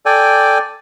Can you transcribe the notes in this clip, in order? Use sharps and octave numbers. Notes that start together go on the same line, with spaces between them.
A4 D5 G5 G#5